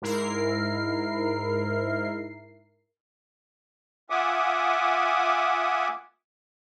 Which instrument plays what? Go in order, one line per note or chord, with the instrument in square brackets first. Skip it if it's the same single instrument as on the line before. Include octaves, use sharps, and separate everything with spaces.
[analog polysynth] G#2 E4 A#4 C7
[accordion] F4 E5 F#5 G#5 D6 D#6